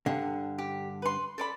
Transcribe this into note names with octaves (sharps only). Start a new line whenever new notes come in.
G2 D3
G4
B4 C6
A4 D5 B5